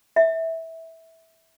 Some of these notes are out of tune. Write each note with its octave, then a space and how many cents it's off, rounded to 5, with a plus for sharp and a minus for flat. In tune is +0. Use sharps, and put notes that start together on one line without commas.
E5 -15